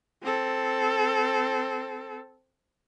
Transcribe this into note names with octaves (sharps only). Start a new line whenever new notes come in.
C4 A4